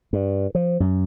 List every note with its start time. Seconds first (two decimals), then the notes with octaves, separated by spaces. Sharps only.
0.13 G2
0.55 F3
0.80 F#2